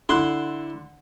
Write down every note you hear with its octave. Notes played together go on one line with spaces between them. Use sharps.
D3 E4 C6 F#6